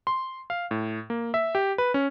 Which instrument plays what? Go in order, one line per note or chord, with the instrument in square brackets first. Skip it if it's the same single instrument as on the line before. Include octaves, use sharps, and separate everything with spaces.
[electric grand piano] C6
F5
A2
A#3
E5
G4
B4
C#4